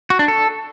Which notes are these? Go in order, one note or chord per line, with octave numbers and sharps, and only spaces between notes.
F#4
D4
A4